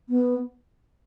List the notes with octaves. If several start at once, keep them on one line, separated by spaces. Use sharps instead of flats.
B3